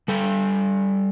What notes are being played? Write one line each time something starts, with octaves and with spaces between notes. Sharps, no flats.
G3 A4